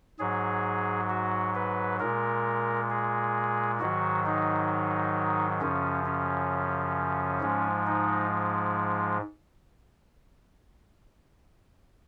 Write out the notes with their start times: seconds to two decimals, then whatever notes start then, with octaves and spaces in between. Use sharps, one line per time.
0.19 G#2 F#3 G#4
1.10 F#4
1.55 B4
2.00 A#2 G#3 A#4
2.90 G#4
3.80 G#2 D#3 F#3 F#4
4.26 D#4
5.61 F#2 C#3 F3 C#4
6.06 C#4
7.41 G#2 F3 G#3
7.87 D#4